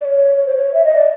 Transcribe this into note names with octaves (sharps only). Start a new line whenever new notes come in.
D5
C#5
C#5
C5
C#5
E5
D#5
D5